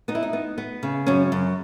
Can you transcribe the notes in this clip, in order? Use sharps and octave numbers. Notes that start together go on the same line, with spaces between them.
B3 D#4
E4
D#4
B3
B3
C#3
F#2 C#4
F#2